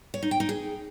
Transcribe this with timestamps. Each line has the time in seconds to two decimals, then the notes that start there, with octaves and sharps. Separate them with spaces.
0.14 C#5
0.23 D#4
0.31 G5
0.40 D#4
0.49 G#4